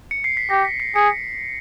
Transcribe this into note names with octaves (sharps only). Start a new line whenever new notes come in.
C#7
C7
B6
G4 A#6
B6
C7
G#4 C#7